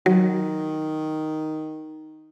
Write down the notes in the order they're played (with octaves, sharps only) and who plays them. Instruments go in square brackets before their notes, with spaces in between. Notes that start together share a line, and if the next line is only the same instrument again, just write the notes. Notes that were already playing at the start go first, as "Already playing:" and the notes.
[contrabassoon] D#3 [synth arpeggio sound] F#3